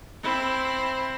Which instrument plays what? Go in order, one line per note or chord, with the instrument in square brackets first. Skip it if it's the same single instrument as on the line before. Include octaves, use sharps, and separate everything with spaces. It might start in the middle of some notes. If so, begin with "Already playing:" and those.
[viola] C4 E4